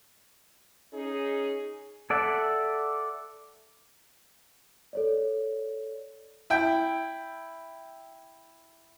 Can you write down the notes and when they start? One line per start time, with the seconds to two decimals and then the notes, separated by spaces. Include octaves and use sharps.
0.93 C#4 D#4 G#4
2.10 A4 D5 E5 F#5
4.93 A4 C#5 D5
6.50 E4 G5